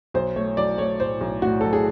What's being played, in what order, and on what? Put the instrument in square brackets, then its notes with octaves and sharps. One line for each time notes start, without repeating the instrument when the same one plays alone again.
[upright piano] B1 C5
A3 C#5
F#3 D5
A3 C#5
A2 C5
B1
A2 F#4
F#3 A4
G#4